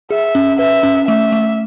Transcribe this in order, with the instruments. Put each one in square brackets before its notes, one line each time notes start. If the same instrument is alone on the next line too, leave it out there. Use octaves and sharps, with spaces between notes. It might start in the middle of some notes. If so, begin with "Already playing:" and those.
[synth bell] G#4 [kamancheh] E5
[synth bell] C#4
[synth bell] B4 [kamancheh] E5
[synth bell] C#4
[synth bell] A3 [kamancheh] E5
[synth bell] A3